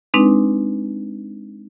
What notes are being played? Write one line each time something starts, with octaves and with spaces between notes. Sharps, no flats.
G#3 C4 D4 D#4 B4